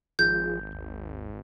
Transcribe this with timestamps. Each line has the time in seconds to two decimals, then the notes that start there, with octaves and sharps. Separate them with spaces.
0.19 G#1 F3 F4 G#4 G6
0.72 D#2